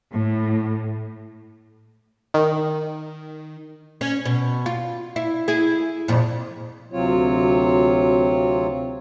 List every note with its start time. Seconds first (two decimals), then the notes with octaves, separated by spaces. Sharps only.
0.14 A2
2.34 D#3
4.01 C#4
4.25 B2
4.66 F4
5.16 E4
5.48 E4 G#4
6.08 F2 A#2
6.92 D2 C3 F#3 C4 F4 C#5